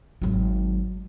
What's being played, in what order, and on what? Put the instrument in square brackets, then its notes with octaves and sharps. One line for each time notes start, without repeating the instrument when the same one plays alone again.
[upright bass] G#1 F#3